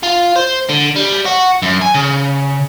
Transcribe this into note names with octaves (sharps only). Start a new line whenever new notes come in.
F4
C5
D3
G3
F#4
F#2
G#5
C#3